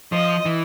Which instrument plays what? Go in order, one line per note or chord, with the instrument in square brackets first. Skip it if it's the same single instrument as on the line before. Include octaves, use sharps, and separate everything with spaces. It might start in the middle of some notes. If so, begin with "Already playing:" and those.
[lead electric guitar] F3 [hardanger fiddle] D#5
[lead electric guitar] E3